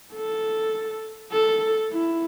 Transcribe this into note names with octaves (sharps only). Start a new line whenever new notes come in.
A4
A4
E4